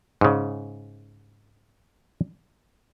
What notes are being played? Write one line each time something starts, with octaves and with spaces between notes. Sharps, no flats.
G#2 C#3